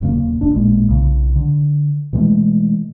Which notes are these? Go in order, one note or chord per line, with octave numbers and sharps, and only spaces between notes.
D#1 F#2 C#3 A#3
G#1 D4
A1 A#2 G#3 A#3
B1 C#3
D3
B2 E3 G#3 A3